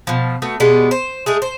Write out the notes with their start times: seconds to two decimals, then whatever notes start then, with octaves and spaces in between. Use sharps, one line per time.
0.07 B2 F3
0.42 A3 B3 F#4
0.60 B2 G3 G#3 B3
0.91 C5
1.26 G#3 A3 G#4
1.42 C5